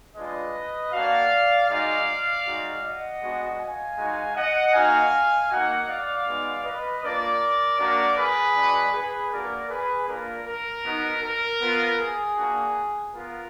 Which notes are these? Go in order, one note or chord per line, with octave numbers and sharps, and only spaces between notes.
G#3 D4 F4 B4 D#5
A#3 D4 F#4 D5 F5
G#3 D#4 F#4 D5 F5
G#3 D#4 F#4
D#5 F#5
G#3 B3 D4 F#4
F5 G#5
G#3 D#4 F#4
D#5 F#5
A#3 D#4 F#4 F5 G#5
A#3 D#4 F#4 D#5 F#5
D5 F5
G#3 B3 D#4 F#4
B4 D#5
A#3 D4 F4 A#4 D5
A#3 D4 F#4 A#4 D5
G#4 B4
G#3 D4 F#4
G#4 B4
A#3 D4 F#4 A#4 D5
G#4 B4
A#3 D4 F4 A#4
A#4
B3 D#4 F#4
A#4
B3 F4
G#4
A#3 D4 F#4
B3 F4 A#4